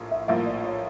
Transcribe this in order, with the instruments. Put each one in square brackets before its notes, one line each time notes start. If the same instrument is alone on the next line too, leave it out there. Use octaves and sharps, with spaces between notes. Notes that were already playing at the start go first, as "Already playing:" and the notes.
Already playing: [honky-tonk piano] A#1 A2 F3 A#3
[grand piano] E5
[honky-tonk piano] A#1 A2 F3 A#3 [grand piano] E5
[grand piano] D5
C#5